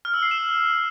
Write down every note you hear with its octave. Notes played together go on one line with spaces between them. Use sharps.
F6
E6
C7
E7